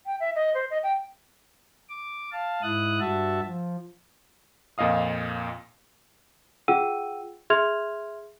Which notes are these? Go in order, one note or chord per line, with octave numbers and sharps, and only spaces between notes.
G5
E5
D#5
C5
D#5
G5
D6
F5 A5
G#2 E4 D#6 F#6
G2 F#4 E5 A5
F3
F2 A#2 D#5 F5 D#6
F4 G#4 F#5 G5 E6 D#7
G#4 E5 C6 F6 G#6 F7